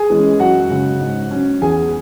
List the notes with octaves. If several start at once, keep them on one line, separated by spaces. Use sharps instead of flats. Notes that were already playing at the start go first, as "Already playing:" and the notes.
Already playing: G#4 G#5
E3 G#3 C#4
F#2 F#4 F#5
C#3 G#3
G#2
F#3 C#4
E2 G#4 G#5